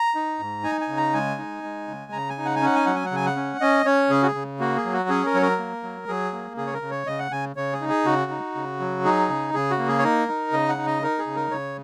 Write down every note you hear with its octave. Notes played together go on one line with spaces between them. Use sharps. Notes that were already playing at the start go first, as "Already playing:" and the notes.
Already playing: A#5
D#4
G#2
D#4 G#5
G#5
C#3
A#5
G#3 G#5
D#4
G#3
C#3
C#3 A#5
G#5
D#4
F#5
G#5
C#4 F#5
G#5
F#3 F#5
G#5
F#5
C#3 G#5
F#5
C#4
C#4 D#5
C#4 C#5
C#3 G#4
F#4
G#4
C#3
A#3 F#4
G#4
F#3
F#4
C#4 G#4
A#4
F#3 C#5
A#4
A#3
F#3
F#3 G#4
A#3
C#3 G#4
C#5
A#4
C#3
C#5
C#3 D#5
F#5
C#3 G#5
C#3 C#5
G#4
D#4
G#4
C#3 F#4
D#4
C#3
F#3
D#4 G#4
C#3
C#3 G#4
F#4
A#3
G#4
C#5
D#4 A#4
D#4
C#3 D#5
F#5
D#4
D#5
D#4 A#4
G#4
C#3
A#4
C#3 C#5